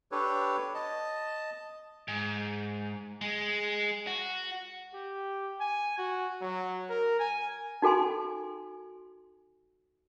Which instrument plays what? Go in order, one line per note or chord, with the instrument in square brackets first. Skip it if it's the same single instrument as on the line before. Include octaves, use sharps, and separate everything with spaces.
[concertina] D4 G4 A4 B4 C#5
D#5 A5
[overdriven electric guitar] G#2
G#3
F#4
[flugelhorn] G4
G#5
F#4
F#3
A#4
G#5
[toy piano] D#4 F#4 A4 G#5 C6